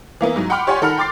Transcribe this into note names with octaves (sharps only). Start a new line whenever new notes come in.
E3 A#3 B3 E4
G#2 F#3
F#5 G5 B5 C6 D6 F6
G4 C#5 D5 F#5 G#5 C6
D#3 A4 A#4 F#5 B5 F6
G5 C6 D6 A6 C7